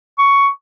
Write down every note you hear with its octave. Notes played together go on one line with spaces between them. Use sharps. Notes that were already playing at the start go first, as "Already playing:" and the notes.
C#6